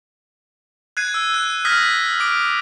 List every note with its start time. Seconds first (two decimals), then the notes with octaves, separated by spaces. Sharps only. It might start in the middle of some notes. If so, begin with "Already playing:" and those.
0.97 F#6 G#6 C7 D#7
1.14 E6
1.34 F#6 D#7
1.65 D#6 F6 G6 G#6 A#6 B6
2.20 D6 D7